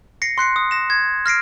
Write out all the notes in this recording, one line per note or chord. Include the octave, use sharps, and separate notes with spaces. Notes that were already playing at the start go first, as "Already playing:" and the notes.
A#6 C7 C#7
C6 F#6 C7 C#7
D#6
A#6 E7
G#6
F6 A#6 C7 D7